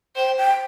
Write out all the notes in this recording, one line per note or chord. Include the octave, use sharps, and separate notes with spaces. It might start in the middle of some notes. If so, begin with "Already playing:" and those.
C5 G5
G5